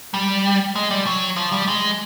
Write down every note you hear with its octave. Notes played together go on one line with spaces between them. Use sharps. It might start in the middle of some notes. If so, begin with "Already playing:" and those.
G3
G#3
G3
F#3
F3
G3
G#3